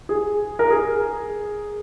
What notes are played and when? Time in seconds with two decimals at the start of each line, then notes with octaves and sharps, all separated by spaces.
0.09 G#4
0.59 A#4
0.71 G#4